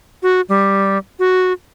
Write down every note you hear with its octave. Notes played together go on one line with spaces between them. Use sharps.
F#4
G3
F#4